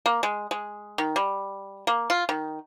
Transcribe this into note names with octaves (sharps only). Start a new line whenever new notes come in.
A#3
G#3
G#3
D#3
G3
A#3
F4
D#3